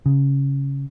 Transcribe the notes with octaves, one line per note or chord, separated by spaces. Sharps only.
C#3